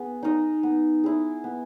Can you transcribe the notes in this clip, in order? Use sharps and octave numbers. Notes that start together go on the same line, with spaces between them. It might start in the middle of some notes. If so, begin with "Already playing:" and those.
Already playing: B3 G#4 B4
D#4 A#4 D#5
B3
E4 G#4
B3